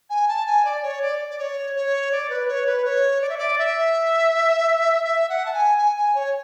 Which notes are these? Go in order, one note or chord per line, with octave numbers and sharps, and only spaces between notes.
G#5
A5
G#5
D5
C#5
D5
D5
C#5
C#5
D5
B4
C#5
B4
C#5
D5
E5
D5
E5
E5
F#5
A5
G#5
G#5
G#5
C#5